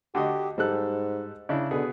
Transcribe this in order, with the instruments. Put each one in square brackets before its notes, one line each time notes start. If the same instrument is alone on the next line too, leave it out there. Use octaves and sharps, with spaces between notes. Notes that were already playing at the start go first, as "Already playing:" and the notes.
[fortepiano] D3 F#4 D#5 [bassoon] G4
[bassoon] G#2 [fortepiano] G3 A4 F#6
[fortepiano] C#3 D4 E4
[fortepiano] B2 B3 G#4 [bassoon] D3